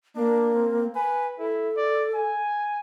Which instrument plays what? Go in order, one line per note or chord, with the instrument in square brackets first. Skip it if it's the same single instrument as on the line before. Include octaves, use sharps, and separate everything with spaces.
[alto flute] A#3 [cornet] D4
[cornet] C4
[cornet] B4 [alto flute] G#5
[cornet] E4 [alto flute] A4
[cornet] D5
G#5